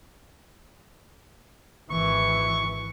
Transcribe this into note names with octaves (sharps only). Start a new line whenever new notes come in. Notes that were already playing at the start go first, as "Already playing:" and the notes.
G#1 E3 C#6